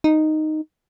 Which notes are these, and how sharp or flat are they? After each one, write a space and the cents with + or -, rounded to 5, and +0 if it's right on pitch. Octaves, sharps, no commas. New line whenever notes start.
D#4 -5